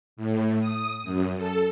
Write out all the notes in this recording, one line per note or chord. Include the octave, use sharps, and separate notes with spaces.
A2
D#6
F#2
A4